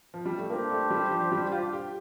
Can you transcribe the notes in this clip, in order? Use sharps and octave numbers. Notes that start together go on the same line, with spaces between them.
F3
G3
A3
A#3 D4 G4 C5
A3
G3
F3
G3
F4
G4